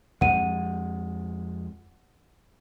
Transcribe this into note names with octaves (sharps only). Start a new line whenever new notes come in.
F2 G#3 F#5 D#7